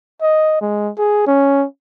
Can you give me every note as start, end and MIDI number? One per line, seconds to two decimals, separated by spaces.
0.22 0.60 75
0.61 0.91 56
0.98 1.23 68
1.27 1.66 61